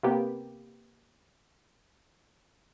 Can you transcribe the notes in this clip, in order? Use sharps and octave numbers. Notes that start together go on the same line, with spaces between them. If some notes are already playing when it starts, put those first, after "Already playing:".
C3 A#3 B3 G4